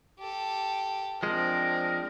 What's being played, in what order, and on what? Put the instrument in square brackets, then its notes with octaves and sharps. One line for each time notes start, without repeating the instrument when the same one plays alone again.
[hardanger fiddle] G4 A4
[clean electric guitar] F3 G#3 [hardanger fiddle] C4 D4 [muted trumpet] A#4